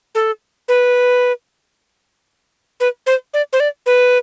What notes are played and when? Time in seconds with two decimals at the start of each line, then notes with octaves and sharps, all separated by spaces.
0.15 A4
0.68 B4
2.80 B4
3.06 C5
3.34 D5
3.53 C5
3.60 D5
3.86 B4